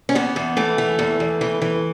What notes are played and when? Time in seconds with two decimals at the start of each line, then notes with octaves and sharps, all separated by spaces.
0.09 C#4
0.15 E2 B3
0.36 E2
0.57 E3 A3
0.78 E3
0.99 E2
1.20 E2
1.41 E3
1.62 E3